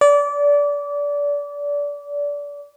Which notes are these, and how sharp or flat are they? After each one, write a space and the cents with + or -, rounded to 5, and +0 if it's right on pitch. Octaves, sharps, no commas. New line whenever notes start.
D5 -25